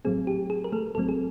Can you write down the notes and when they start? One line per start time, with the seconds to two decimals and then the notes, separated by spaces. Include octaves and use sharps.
0.05 A1 A2 F#3 A3 C4 G#4
0.27 G4
0.50 G#4
0.64 A#4
0.72 A3 A4
0.95 A1 A2 F#3 A3 C4 A4
1.09 G#4